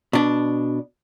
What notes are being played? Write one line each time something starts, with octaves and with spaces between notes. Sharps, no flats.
B2 D4